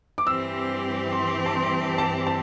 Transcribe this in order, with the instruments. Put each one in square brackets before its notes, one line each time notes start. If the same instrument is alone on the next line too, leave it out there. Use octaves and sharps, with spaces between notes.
[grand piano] D6
[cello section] G2 E3 C4 G4 [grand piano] E6
[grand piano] C6
A5
C6
A5
A5